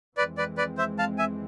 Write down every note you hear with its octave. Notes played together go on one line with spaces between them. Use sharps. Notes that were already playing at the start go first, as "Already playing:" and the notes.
F2 E3 G#3 C4 B4 D5
B4 D5
B4 D5
C5 E5
F5 A5
E5 G#5